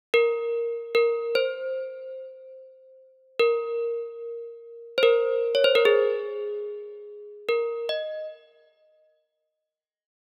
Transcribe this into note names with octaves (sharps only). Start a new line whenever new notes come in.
A#4
A#4
C5
A#4
C5
A#4
C#5
C5
A#4
G#4
A#4
D#5